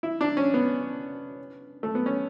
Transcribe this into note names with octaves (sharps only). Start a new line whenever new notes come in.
E4
D4
C#4
B3
A3
B3
C#4